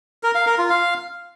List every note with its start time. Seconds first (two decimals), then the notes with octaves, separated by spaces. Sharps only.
0.23 A#4
0.35 F5
0.47 A#4
0.58 F4
0.70 F5